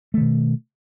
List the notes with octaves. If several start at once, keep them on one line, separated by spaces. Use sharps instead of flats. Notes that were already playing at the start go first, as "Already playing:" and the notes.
B2 D#3 A3